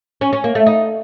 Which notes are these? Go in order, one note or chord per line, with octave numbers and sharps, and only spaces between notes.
C#4
C#4
A#3
A3
D#4